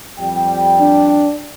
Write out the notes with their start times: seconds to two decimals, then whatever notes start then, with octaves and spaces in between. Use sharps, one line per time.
0.18 F2 G3 G5
0.80 D4